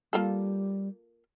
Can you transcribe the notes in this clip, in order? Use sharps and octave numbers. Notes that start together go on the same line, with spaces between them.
G3 A#3 F4 A4